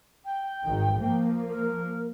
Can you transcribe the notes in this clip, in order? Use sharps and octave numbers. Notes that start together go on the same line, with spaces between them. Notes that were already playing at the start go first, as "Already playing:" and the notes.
G5
G#1 D#3
F3 A#3
A#4